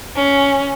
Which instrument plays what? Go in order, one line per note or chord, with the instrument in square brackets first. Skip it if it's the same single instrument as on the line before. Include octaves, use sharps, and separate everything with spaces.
[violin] C#4